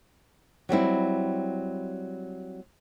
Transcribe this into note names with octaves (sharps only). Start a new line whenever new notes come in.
F#3 G3 C4 E4